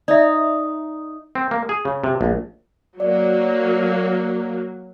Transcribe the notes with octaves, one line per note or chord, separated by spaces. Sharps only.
D#4 D5 E5
C4
A#3
G#4
C#3
C3
A#1
F#3 A#3 D5